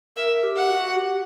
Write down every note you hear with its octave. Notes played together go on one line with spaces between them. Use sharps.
A#4 E5
G4
F#5
F#4
G4